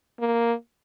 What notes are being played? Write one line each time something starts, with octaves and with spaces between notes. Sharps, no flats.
A#3